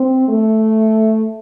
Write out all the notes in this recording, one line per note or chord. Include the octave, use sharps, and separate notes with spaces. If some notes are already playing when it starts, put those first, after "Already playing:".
Already playing: C4
A3